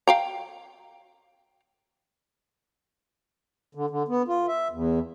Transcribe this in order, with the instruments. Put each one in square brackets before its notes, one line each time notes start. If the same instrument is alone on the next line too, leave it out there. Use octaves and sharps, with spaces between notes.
[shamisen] F5 G5 A#5
[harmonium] D3
D3
B3
F4
E5
E2